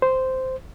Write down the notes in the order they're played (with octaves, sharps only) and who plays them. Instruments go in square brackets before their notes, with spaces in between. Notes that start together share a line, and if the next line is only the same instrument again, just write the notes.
[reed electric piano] C5